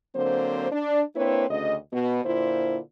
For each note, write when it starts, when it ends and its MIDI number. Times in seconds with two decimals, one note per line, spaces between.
0.15 0.71 50
0.15 0.71 54
0.15 0.71 58
0.15 0.71 60
0.15 0.71 72
0.72 1.01 62
1.16 1.45 58
1.16 1.45 60
1.16 1.45 62
1.16 1.45 64
1.16 1.45 71
1.16 1.45 73
1.50 1.76 38
1.50 1.76 49
1.50 1.76 75
1.93 2.20 47
2.25 2.79 46
2.25 2.79 50
2.25 2.79 64
2.25 2.79 65
2.25 2.79 72